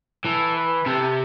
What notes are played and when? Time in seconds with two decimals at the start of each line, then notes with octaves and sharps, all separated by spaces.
0.25 E3 A4
0.56 B4
0.86 C3 A4